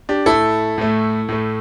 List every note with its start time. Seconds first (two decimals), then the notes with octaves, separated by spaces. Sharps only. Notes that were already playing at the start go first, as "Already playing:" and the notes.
0.09 D4 G4
0.26 A2 A3 E4 A4
0.78 A2 A3
1.29 A2 A3